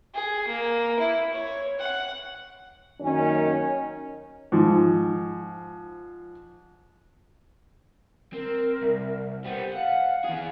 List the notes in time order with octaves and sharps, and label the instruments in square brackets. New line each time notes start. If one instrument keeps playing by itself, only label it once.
[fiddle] G#4
A#3
E4
C#5
F#5
[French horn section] F#2 D#3 A#3 C#4
[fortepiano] G#2 F3
[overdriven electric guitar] C4 [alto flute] A#4
[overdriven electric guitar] C2
[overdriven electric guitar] G3 B3 [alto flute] C5
[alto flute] F5 [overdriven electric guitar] F#5
[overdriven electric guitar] E3 G#4